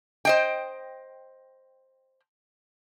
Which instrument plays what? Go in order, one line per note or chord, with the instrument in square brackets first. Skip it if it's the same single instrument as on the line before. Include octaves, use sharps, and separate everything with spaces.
[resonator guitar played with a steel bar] C5 D#5 G5